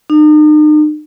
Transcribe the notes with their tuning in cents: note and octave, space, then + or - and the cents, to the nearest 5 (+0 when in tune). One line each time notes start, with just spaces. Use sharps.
D#4 -40